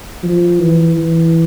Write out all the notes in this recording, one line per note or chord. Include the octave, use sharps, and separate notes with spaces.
F3
E3
E3